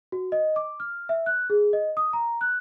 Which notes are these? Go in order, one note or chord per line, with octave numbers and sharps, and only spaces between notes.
F#4
D#5
D6
F6
E5
F#6
G#4
D#5
D#6
A#5
F#6